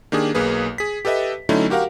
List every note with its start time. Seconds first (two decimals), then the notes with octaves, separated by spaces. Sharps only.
0.12 D#3 A#3 D4 G4 G#4
0.35 B1 A#3 G#4 B4
0.78 G#4 B6
1.05 G4 A4 B4 D#5 E5
1.49 D3 F#3 A3 C#4 D#4 E4
1.70 F#4 G4 A#4 F5 F#5